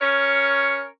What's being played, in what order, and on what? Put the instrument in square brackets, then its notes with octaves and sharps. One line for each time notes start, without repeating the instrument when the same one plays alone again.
[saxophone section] C#4 A#4 C#5